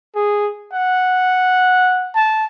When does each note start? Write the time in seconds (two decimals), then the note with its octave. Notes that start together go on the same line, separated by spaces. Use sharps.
0.15 G#4
0.73 F#5
2.15 A5